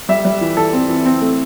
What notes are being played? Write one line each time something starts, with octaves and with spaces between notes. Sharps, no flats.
G3 E5
G3
E3
E3 A4
C4
E3
C4
A3